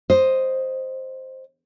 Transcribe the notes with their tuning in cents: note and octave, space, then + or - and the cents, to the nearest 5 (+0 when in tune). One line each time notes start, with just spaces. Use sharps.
C5 +0 D#5 +0